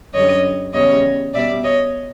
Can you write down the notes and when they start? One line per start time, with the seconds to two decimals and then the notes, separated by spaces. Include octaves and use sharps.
0.13 F#2 D3 G3 C#5 D#5
0.73 E2 C#3 E3 G3 C#5 D#5
1.34 B2 G3 D5 E5
1.63 C#5 D#5